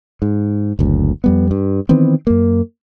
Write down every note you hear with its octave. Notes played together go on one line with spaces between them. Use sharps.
G#2
F#1 D2
F2 G3 B3
G2
D#3 E3 B3 C4
F#2 A#3